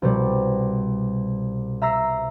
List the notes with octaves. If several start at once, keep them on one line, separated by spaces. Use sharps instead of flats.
C2 B2 G3
E5 A#5 E6 A#6 C7